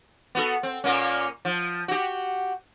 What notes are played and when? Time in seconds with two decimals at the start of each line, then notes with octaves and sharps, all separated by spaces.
0.35 B3 F#4 A4
0.63 C4
0.84 A#2 A#3 C#4
1.45 F3
1.88 F#4 G4